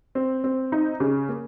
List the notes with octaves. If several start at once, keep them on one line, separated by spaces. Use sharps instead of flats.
C4
C4
D#4
C#3
A#3